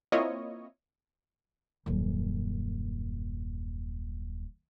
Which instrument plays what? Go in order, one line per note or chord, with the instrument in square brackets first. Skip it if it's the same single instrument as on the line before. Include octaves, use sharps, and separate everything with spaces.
[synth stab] A#3 C4 E4 F4 C#5 D#5
[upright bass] D#1 F#2